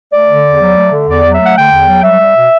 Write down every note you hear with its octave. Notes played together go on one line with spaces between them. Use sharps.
A3 D5
D3
E2
F#3
A3
D3
E2 D5
F#3
E5
A3
F#5
D3 G5
E2
F#3
G3 E5
G3
B2